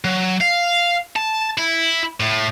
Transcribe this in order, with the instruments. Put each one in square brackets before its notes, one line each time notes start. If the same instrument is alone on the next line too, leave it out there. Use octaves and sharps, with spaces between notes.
[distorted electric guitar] F#3
F5
A5
E4
A2